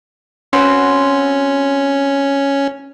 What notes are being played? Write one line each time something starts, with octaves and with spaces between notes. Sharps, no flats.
C4 C#4 F#4 B4